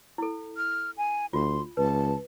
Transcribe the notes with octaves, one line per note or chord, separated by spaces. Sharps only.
E4 A4
F6
G#5
D2 F4 C6
C#2 B4 A5